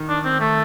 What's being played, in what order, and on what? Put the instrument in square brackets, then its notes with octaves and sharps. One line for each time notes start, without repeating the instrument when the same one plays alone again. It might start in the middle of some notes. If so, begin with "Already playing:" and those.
Already playing: [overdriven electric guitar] D#3
[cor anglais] D4
C4
A3